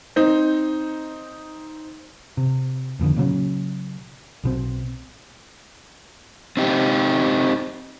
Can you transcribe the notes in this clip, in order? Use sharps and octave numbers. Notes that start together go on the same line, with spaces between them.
C4 D#4
C3
F1 F2 B2 D3
A#2 C#3 F#3 C#4
B1 B2 C4
C4 D#4 G4